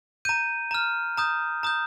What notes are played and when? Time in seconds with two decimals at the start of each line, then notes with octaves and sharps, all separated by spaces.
0.25 A#5 G6 D#7
0.71 A#5 F6
1.17 A#5 D#6 G6
1.63 A#5 D#6 G6